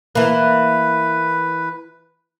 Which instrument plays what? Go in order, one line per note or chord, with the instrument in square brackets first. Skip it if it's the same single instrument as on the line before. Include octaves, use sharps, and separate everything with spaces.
[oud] E3 A#3 [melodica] B4